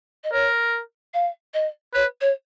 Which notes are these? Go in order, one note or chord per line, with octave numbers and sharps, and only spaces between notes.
D#5
A#4 C#5
F5
D#5
B4 C#5
C#5